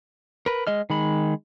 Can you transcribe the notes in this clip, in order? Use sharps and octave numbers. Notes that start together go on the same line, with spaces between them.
A#4 B4
G#3 D#5 F6
D#3 G#3 B5